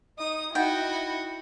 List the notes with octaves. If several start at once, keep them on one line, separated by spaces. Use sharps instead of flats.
D#4 D#6
D#4 E4 F#4 D#5 F#5 G5